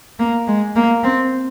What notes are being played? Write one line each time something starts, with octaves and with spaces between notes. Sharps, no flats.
A#3
G#3
A#3
C4